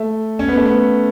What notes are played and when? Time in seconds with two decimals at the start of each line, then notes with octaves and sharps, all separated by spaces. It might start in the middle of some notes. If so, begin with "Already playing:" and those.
Already playing: A3
0.39 C#4
0.48 B3
0.57 A3
0.66 B3